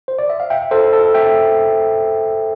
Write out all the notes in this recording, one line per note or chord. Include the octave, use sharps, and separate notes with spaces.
C5
D5
E5
F5
E5 G5
A4 C5
A4
E5 G5